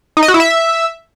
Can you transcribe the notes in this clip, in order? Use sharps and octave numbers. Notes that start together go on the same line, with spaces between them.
D#4
D#5
F#4
E4
E5